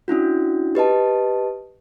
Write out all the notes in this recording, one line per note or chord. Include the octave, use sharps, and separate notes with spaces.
C#4 D4 E4 F#4
G4 B4 D#5 A5